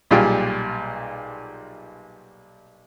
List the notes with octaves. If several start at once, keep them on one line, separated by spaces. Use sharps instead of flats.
B1 A#2 G3 F4 G#4 G5